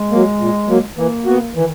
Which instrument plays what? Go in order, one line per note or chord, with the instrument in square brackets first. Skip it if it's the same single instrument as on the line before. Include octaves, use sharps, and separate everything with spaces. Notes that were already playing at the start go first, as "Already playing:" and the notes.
Already playing: [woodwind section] G#3
[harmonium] F#3 A#3
A#2
F#3 A#3
[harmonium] E3 [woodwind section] A#3
[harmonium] B3 F#4
[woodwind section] D#3 [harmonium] E3